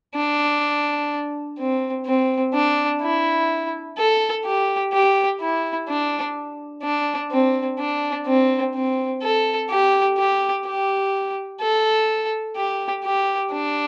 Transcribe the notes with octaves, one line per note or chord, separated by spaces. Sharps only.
D4
C4
C4
D4
E4
A4
G4
G4
E4
D4
D4
C4
D4
C4
C4
A4
G4
G4
G4
A4
G4
G4
D4